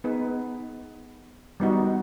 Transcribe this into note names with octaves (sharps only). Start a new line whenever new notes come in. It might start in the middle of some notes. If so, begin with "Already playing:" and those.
B3 D#4 G#4 B4
G3 B3 D#4 F#4